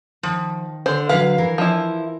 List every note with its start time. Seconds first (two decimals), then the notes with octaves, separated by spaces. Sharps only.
0.23 D#3 F3
0.86 D3 C5
1.09 D3 F3 F#3 B4 F5
1.38 E3 A#4
1.58 F3 E4